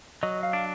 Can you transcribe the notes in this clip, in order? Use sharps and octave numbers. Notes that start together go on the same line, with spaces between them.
F#3 D#5
F5
D4